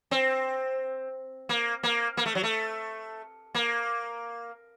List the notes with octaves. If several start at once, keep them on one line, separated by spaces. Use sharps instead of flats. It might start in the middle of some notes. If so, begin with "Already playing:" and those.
C4
A#3
A#3
A#3
A3
F#3
A3
A#3